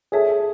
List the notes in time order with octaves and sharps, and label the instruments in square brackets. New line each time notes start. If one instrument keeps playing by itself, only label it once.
[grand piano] G#4 [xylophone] A4 C#5 E5 A5